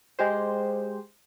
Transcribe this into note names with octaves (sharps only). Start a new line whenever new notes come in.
G#3 G4 C5